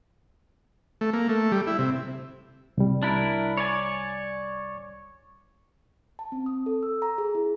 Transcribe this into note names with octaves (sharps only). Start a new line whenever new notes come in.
A3
A#3
A3
G3
E4
C3
C2 G3
D4 E4 A#4
C#5 D5 G#5
A5
C4
D#6
A4
E6
A#5
G#4
E4